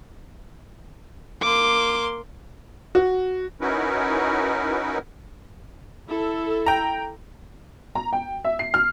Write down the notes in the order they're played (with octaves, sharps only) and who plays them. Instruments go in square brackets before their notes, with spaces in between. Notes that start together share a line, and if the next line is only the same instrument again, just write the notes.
[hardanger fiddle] A#3 C6 [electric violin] D6
[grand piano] F#4
[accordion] C#4 D#4 E4 F#4 A#4 B4
[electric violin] E4 [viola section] A4
[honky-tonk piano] G5 A#5
A#5
G5
E5
C7
F6